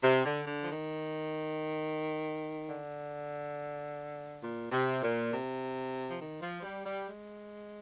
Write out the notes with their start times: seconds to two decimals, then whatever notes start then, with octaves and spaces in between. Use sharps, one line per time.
0.02 C3
0.24 D3
0.47 D3
0.62 F3
0.69 D#3
2.67 D3
4.43 A#2
4.72 C3
5.02 A#2
5.32 C3
6.09 F3
6.18 D#3
6.42 F3
6.62 G3
6.85 G3
7.07 G#3